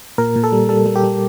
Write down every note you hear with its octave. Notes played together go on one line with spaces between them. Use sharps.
A#2 A#4
A#2
A4
G3
G3 A4
G3
G4
G3